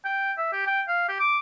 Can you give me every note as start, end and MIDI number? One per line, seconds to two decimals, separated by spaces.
0.05 0.32 79
0.38 0.48 76
0.53 0.64 67
0.66 0.82 79
0.88 1.05 77
1.09 1.17 67
1.20 1.38 86